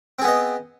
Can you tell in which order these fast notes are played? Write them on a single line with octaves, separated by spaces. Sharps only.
C4 G#4 B3 D#5